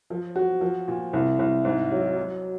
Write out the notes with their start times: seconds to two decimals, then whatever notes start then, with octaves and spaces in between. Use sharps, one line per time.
0.10 F3
0.36 F#4
0.61 F3
0.88 A#2
1.13 C2
1.39 C2
1.65 G#2
1.91 F#3
2.17 F#3